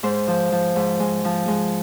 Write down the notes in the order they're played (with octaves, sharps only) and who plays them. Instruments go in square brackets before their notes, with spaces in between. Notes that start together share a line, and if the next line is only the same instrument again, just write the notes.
[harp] G#2 C5
F3
F3
G#2
G#3
F3
G#3